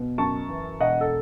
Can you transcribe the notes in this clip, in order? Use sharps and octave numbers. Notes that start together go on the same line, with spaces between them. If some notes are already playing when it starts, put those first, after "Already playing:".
Already playing: B2
F#2 A5 C#6
E3
E1 D#5 F#5
A4